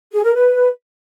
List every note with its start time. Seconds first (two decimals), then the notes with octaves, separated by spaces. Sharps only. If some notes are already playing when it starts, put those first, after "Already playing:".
0.13 G#4
0.24 A#4
0.35 B4